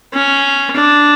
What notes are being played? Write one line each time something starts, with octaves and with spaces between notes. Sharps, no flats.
C#4
D4